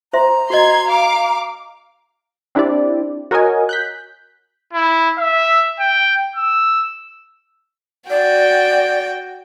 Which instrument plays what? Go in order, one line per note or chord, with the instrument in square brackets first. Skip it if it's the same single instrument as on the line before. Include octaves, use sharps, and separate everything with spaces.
[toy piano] C5 E5 C6 [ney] A#5
[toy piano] F#4 D#5 [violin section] C6 G#6
[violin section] F5 D6
[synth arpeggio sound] C4 D4 E4 G4 D5
F#4 A#4 C#5 D#5 G#5
F#6 G6 B6
[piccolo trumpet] E4
E5
G5
E6
[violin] F#4 G5 [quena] D5